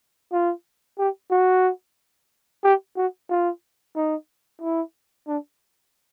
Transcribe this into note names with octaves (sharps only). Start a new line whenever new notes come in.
F4
G4
F#4
G4
F#4
F4
D#4
E4
D4